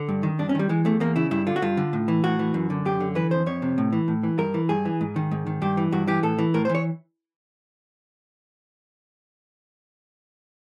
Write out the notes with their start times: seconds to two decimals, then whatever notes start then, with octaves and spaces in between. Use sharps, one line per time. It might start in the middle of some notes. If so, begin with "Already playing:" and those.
Already playing: D3
0.09 G2
0.23 D#3
0.39 G2 D4
0.49 C#4
0.55 D#3 G3
0.69 E3 G#3
0.85 E2 A3
1.00 E2 A#3
1.16 C#3 E4
1.31 G2 E4
1.47 D3 F4
1.56 F#4
1.62 G2 F4
1.77 D3
1.93 A2
2.08 E3
2.24 A2 F#4
2.39 E3
2.54 F#2
2.70 D3
2.85 F#2 G4
3.00 D3
3.15 E3 B4
3.31 F2 C5
3.46 F2 C#5
3.62 C3
3.78 A2
3.92 E3
4.08 A2
4.23 E3
4.38 G2 A#4
4.54 E3
4.69 G2 G#4
4.85 E3
5.01 G#2
5.16 D#3
5.31 G#2
5.46 D#3
5.62 G2 G4
5.77 E3
5.92 G2 F#4
6.07 E3 G4
6.23 A2 A4
6.39 E3
6.54 A2 A#4
6.65 C5
6.69 E3
6.75 C#5